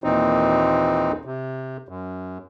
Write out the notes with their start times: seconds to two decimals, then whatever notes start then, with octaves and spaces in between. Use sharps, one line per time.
0.04 D#2 A#2 E3 C4 D#4
1.25 C3
1.89 F#2